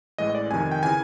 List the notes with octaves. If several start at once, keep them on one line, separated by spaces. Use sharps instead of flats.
A1 A2 E3 G#3 D#5
D5
F2 C3 D#3 G#5
G5
C#3 E3 G#5